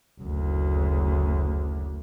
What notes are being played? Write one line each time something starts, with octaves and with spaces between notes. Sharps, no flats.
F#1 D2